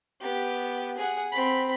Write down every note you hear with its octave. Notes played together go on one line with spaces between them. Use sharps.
B3 G4
G#4 F#5
C4 B5